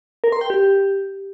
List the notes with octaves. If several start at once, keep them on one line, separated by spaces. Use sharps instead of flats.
A#4
C6
G5
G4